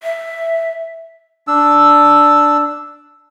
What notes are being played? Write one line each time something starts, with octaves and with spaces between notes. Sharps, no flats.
E5
D4 E6